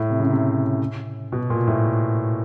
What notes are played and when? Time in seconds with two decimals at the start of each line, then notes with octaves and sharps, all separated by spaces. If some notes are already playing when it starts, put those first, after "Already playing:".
Already playing: A2
0.10 C3
0.20 C#3
0.31 C3
1.32 B2
1.50 A#2
1.67 A2